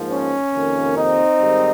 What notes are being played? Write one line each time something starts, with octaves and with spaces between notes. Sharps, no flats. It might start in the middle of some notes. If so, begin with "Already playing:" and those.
Already playing: G#2 F3 A#3
C#4
F2 C3 D#3 A#3
C4 D#4
G#2 D#3 G3